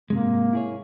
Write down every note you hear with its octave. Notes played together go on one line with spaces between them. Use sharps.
G#2 C3 G#3 A#3
E4 G#4 C#5